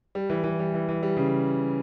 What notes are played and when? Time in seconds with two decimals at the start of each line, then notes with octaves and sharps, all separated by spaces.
0.15 G3
0.30 E3
0.44 E3
0.59 G3
0.74 E3
0.89 E3
1.03 G3
1.16 C#3